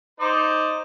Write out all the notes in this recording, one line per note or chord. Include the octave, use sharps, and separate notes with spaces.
D#4 C5 D5